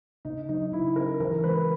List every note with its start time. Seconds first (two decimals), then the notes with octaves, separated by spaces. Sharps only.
0.25 C#3 D#4
0.49 F#3 D#4
0.72 C#3 E4
0.96 C#4 A#4
1.20 E3 A#4
1.44 G#3 B4